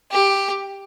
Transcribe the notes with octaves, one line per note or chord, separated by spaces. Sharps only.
G4